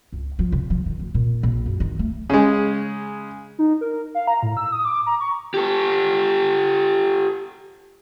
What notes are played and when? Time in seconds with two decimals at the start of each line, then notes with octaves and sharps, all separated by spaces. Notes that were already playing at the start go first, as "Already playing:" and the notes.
0.12 C#2
0.39 F3
0.52 C#3
0.70 F3
0.86 D#3
0.99 D2
1.14 A#2
1.43 A#1
1.66 F#2
1.80 D#3
1.99 A3
2.30 C#3 G#3
3.59 D#4
3.81 A#4
4.15 F5
4.27 A#5
4.43 A2
4.57 E6
4.72 D#6
4.85 D6
5.06 A#5
5.20 C#6
5.54 G4 A4